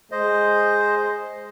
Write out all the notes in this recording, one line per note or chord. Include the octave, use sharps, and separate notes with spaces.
G#3 C5 D#5